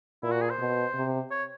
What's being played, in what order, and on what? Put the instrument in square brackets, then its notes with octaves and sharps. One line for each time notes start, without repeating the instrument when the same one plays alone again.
[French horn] A#2 [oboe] E4
[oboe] F#4
G#4
C5
[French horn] B2
C3
[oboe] C#5